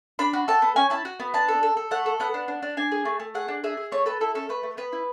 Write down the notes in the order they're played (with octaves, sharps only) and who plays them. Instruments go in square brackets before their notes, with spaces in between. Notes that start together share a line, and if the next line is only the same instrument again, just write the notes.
[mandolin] D4 B5
F#4
A4 A5
B3
C#4 G#5
E4 A5
F#4
B3
D4 A5
A4
A4
A4
A3 F#5
A4
B3 F#5
D4
D4
D4
D4 G#5
G#4
A3
A3
G#4 F#5
D4
G#4 E5
G#4
A3 C#5
A4 B4
E4 A4
C#4 A4
A3 B4
A3
B3 B4
E4